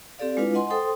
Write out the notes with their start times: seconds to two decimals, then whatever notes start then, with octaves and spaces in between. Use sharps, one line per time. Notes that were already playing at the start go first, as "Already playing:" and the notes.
0.19 C4 G4 A4 D5 F5
0.37 G#3 D4 E4 F4 B4 F5
0.54 D#5 F#5 G#5 C6
0.70 A4 C5 G5 C6 D#6